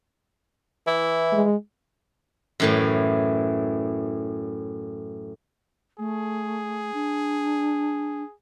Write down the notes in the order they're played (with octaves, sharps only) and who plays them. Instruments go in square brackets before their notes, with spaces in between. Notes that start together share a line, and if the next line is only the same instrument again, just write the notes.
[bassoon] E3 [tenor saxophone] E4
[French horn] G#3
[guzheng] F#2 A2 E3
[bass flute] A3 [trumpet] G#4
[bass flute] D4